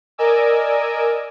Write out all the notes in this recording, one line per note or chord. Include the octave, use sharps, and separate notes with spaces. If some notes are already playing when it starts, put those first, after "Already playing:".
A#4 D5 D#5 G#5 D6 E6